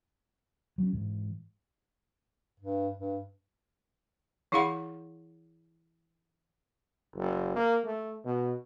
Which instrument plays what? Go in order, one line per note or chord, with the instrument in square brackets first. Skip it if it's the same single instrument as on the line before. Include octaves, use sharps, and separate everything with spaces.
[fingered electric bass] F#3 C#4
G#2 E3
[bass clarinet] G2
G2
[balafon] E3 E4 G#4 F5 F#5 B5
[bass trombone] F#1
A#3
A3
B2